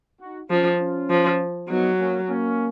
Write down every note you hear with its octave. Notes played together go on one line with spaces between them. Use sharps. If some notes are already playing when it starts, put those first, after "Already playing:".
D#4 F#4
F3 C#4 F4
C#4 F4
F3
F#3 B3 D#4
A#3 C#4
A#3 C#4